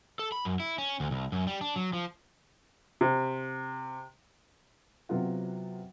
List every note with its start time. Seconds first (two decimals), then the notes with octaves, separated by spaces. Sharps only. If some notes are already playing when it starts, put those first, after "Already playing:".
0.19 A4
0.32 B5
0.45 F#2
0.60 E4
0.78 C#4
1.00 D2
1.11 C2
1.32 F#2
1.47 G3
1.61 D4
1.76 F#3
1.93 F3
3.01 C3
5.09 C3 F#3 B3 C4 F4 F#5